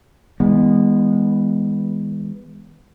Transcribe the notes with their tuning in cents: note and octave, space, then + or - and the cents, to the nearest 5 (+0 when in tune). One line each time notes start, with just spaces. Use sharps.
D#3 +45 G#3 -25 B3 +0